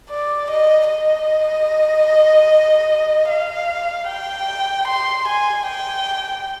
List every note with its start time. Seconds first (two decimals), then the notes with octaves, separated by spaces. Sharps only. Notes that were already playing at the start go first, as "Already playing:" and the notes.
0.10 D5
0.51 D#5
0.90 D#5
3.29 F5
4.08 G5
4.88 C6
5.28 G#5
5.67 G5